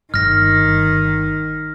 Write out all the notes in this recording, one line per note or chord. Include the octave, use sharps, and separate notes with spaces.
G1 D#3 F6 A#6